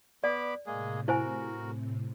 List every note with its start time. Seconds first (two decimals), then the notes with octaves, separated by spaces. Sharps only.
0.24 B3 D5 B5 D6
0.66 A2 C3 G#3 A#3 G#4
1.08 E4 F#4 A#4 C5 G#5